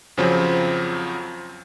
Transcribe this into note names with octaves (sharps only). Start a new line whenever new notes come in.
F2 C#3 F3 F#3 C4